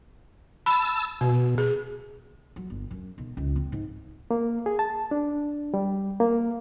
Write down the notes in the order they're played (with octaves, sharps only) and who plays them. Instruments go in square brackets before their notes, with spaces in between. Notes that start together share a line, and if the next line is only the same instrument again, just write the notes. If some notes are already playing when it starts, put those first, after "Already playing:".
[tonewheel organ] A5 E6 [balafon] B5
[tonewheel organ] B2 [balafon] B3
[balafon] G#4
[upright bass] F#3
G1
F#2
B1
C#2
C4
G#2
[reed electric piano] A#3
G#4
A5
D4
G3
A#3